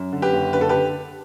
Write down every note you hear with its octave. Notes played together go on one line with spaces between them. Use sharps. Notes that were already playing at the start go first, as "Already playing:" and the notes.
Already playing: F#2
D3
G4 B4
F#1
D3 B4
A4
D3 G4 B4